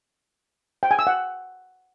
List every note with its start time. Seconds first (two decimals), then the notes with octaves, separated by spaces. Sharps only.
0.83 G5
0.91 G#5
0.99 E6
1.07 F#5